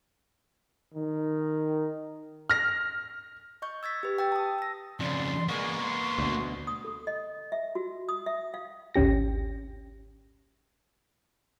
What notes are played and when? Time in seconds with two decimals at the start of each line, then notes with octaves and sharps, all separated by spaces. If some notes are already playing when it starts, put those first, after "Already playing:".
0.95 D#3
2.50 F6 A#6
3.62 D#5 C#6 G6
3.83 E6 G#6 A6 B6
4.03 G4 B4
4.18 G5 E6 A6
4.32 A5 D#6
4.58 E6 A#6
5.00 F2 C#3 D5 C6
5.48 G#3 A#3 B3 C#6
5.80 C6
6.19 D2 B2
6.67 D#6
6.84 A4
7.07 D#5
7.52 E5
7.75 F#4
8.09 D#6
8.26 E5
8.54 F5
8.94 G#1 D2 C#4 G4 A#6